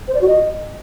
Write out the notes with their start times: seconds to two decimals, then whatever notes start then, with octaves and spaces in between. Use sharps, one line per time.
0.08 C5
0.15 D5
0.21 F#4
0.28 D#5